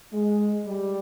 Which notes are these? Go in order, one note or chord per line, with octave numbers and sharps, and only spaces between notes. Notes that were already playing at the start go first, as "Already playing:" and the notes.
G#3
G3